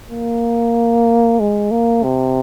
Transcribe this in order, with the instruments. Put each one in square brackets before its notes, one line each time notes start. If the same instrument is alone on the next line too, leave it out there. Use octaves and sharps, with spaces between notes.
[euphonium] A#3
G#3
A#3
C3